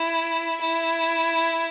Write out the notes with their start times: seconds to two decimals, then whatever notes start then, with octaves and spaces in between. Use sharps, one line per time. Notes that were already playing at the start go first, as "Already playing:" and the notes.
Already playing: E4
0.61 E4